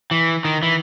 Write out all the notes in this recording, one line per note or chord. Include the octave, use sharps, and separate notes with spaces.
E3
D#3
E3